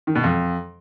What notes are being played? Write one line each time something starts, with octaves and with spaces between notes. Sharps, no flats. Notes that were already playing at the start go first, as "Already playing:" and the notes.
D#3
B2
F2